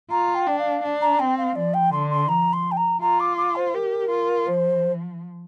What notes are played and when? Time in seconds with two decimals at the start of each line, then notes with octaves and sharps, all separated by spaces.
0.11 F4 A#5
0.35 G5
0.47 D4
0.59 F5
0.83 D4
1.01 A#5
1.19 C4 G5
1.38 F5
1.56 F3 D5
1.74 G5
1.92 D3 C6
2.11 C6
2.29 F3 A#5
2.53 C6
2.72 G5
2.77 A#5
3.01 F4 A#5
3.20 D6
3.38 D6
3.56 C5
3.74 G4 A#4
4.10 F4
4.47 F3 C5